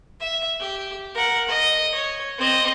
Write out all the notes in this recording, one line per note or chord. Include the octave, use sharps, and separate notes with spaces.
E5
G4
A#4 F#5
D#5
C#5
C4 D#5